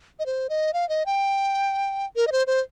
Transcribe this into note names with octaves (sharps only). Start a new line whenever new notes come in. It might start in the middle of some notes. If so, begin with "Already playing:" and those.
D#5
C5
D#5
F5
D#5
G5
A#4
D#5
C5
C5